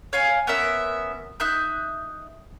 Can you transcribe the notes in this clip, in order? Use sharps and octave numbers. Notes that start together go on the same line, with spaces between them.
C#5 F5 G#5
B3 C#4 A#4 E5
D#4 E5 F#6 G6